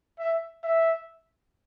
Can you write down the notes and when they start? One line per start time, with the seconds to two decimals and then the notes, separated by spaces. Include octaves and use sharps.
0.19 E5
0.64 E5